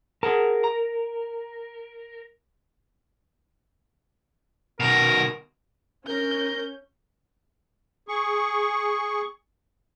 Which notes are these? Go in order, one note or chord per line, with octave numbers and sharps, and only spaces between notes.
G#4 A#4 F#5 A5
A#5
B2 D#3 A#4
C#4 A#4 G6
G#4 C#6